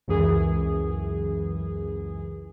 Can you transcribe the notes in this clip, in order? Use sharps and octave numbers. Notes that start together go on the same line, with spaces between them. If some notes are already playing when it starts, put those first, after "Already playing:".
C#2 F#2 E3 G#4